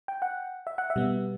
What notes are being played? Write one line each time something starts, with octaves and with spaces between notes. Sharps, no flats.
G5
F#5
E5
F#5
E5
B2 G3 B3